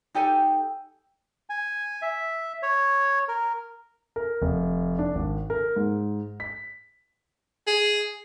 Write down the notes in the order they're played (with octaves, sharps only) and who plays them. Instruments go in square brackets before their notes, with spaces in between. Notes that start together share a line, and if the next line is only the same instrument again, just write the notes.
[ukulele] D#4 G4 A4 G#5
[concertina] G#5
E5
C#5
A#4
[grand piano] A#4
F1
D4
G#1
A#4
G#2
B6
[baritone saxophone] G#4